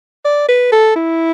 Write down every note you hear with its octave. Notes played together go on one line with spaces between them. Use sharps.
D5
B4
A4
E4